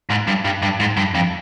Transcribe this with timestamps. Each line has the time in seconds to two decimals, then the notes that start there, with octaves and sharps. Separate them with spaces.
0.09 G#2
0.27 G2
0.44 G2
0.62 G2
0.80 G#2
0.97 G2
1.15 F2